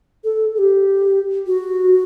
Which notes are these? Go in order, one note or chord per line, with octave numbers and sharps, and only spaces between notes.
A4
A4
G4
F#4